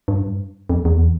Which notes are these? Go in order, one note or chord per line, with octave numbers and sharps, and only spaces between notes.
G2
F2
E2